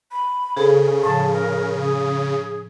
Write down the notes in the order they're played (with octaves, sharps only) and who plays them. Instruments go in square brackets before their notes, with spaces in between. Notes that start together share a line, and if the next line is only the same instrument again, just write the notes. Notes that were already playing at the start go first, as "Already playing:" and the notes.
[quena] B5
[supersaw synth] C#3 [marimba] G#4 A4 C5
[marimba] A2 F3 [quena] A5
[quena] A#4
G#4